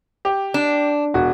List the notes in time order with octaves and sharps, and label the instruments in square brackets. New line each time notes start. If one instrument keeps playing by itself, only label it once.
[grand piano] G4
[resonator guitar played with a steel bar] D4
[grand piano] E1 [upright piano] F#4